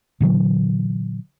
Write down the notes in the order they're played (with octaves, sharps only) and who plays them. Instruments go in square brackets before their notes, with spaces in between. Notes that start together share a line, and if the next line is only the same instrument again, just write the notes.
[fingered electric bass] A#2 D3 E3 F#3